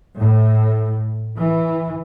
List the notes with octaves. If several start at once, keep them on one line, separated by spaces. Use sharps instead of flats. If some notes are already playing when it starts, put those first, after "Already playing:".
A2
E3